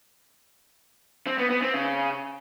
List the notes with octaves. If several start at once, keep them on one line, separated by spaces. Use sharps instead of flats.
C4
B3
B3
C4
C#3